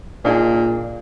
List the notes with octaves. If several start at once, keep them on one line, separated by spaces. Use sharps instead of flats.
A#2 D4 D#4 G#4